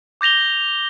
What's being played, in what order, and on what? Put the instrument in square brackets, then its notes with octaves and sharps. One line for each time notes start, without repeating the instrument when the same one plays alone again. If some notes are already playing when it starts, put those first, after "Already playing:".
[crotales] D6 G6 A#6 F7 G7